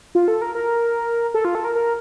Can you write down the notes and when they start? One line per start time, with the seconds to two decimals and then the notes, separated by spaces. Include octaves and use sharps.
0.15 F4
0.28 A4
0.42 A#4
0.55 A#4
1.34 A4
1.45 F4
1.55 A4
1.65 A#4
1.75 A#4